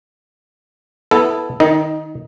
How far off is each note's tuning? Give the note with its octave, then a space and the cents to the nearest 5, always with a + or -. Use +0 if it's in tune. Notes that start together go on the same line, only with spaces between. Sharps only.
B3 +0 E4 +0 A4 +0
D#3 -5 D#4 +25 D#5 +0